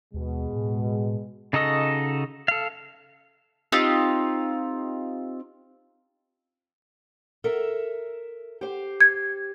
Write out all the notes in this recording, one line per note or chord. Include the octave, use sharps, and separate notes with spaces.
D#2 B2 G#3
A2
C#3 D#4 F#4 A4 D#5
A4 F5
C4 D#4 F4 G4
A4 A#4 E5
G4 C5
G#6